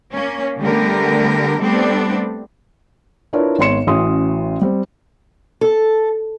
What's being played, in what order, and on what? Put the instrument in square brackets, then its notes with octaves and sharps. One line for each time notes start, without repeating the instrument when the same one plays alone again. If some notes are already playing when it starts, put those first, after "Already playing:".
[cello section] A#3 C#4
D3 G3 A3 B3 G4 A#4
G3 A3 B3 C4 D4 A4
[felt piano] D4 E4 F4 A#4 B4 C#5
G#1 B3 C#5 C6 C#7 E7
A1 E3 C#4 F#4 C6 D#6
G3 C4
[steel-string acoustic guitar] A4